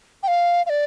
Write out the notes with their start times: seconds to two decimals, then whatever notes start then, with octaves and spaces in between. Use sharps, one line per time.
0.23 G5
0.28 F5
0.66 F5
0.70 D5